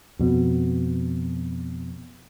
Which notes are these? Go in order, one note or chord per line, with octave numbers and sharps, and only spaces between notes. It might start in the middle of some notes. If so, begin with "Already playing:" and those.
F2 B2